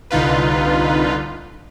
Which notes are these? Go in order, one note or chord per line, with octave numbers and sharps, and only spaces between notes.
C2 D3 D#4 F4 B4